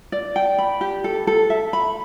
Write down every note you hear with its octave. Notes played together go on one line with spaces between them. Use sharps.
D5
G5
B5
G4
A4
A4
E5
B5